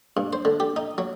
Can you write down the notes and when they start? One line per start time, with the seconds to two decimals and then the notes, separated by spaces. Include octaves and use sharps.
0.17 G2
0.33 C5
0.45 D3
0.60 G4
0.76 D#4
0.98 F#3